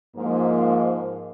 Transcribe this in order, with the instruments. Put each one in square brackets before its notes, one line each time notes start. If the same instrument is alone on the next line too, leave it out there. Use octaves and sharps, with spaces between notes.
[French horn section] G#2 F3 A#3